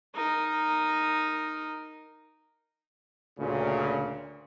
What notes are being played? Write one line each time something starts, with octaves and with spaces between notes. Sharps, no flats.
D#4 A#4
D2 A#2 C#3